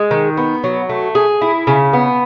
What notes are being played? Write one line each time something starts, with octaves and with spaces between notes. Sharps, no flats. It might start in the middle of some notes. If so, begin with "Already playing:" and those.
Already playing: G#3
D#3
B3
F#3
A3
G#4
E4
C#3
B3